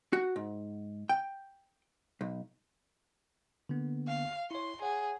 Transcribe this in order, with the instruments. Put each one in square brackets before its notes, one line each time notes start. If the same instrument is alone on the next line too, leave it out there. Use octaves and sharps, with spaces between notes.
[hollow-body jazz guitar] F#4
G#2
G5
B1
[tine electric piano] D3 A#3 B3
[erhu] F5
[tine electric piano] E4 C#5 [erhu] C6
[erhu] G#4 [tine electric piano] C#5 F#5